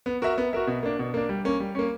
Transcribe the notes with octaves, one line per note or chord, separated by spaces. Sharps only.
B3
F#4 A#4 E5
B3
F#4 A#4 E5
B2
A#3 D4
B2
A#3 D4
G3
A#3 C#4
G3
A#3 C#4